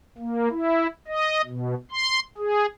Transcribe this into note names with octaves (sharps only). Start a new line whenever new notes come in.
A#3
E4
D#5
B2
C6
G#4